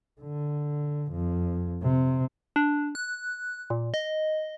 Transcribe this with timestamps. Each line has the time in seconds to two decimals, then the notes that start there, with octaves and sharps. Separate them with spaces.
0.21 D3
1.12 F2
1.82 C3
2.56 D4
2.95 F#6
3.70 A#2
3.94 D#5